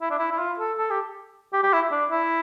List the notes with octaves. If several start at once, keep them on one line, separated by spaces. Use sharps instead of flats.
E4
D4
E4
E4
F4
A4
A4
G4
G4
G4
E4
D4
E4